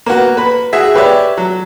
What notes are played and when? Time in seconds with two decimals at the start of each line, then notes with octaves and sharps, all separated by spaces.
0.06 A#3 B3 F#4
0.37 B4 B5
0.73 F#4 G#4 E5
0.95 G4 B4 C#5 D5 E5
1.37 F#3